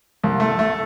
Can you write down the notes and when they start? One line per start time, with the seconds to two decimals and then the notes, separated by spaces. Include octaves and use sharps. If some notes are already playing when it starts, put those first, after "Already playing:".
0.24 C2
0.40 A3
0.59 A3